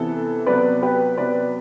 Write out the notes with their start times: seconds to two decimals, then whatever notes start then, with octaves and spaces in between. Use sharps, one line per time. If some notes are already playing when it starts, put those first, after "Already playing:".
Already playing: C3 E3 B3 A4
0.46 C3 F#3 B3 B4 D5
0.82 G4 B4
1.17 C3 F#3 B3 B4 D5